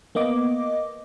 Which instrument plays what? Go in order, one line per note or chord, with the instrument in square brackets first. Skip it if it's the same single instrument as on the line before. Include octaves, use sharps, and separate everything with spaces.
[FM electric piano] A#3 B3 D#5 D6